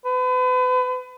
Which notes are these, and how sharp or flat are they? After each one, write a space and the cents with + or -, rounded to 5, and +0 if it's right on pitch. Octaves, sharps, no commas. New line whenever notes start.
B4 +35